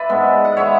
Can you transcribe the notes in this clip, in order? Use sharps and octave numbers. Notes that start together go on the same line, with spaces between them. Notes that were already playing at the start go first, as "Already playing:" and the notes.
Already playing: B4 D5 E5
G#2 G#3 B3
F#5
G#3 B3 C#5 E5